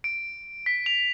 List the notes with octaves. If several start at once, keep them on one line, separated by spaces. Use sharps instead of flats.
D7
B6
F7